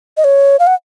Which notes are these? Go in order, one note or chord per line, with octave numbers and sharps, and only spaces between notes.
D#5
C#5
F5
F#5